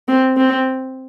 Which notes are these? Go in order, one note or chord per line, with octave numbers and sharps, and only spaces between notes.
C4
C4